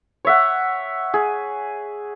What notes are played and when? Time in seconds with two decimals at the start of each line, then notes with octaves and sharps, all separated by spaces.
0.25 C#5 E5 F#5
1.14 G#4